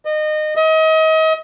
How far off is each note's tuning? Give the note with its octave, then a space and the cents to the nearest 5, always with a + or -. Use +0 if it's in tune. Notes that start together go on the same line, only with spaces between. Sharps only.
D#5 -25
D#5 +35